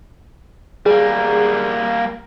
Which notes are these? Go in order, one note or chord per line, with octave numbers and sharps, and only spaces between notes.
G3 A#3 G#4